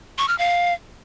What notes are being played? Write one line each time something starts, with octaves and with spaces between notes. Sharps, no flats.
C#6
F6
F5